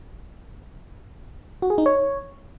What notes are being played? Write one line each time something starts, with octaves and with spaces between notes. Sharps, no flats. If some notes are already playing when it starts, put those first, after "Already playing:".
F#4
G#4
D#4
C#5